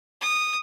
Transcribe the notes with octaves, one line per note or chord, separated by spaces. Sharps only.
D#6